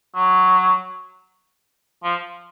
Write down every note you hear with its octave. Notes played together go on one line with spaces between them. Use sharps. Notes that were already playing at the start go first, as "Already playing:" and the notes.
F#3
F3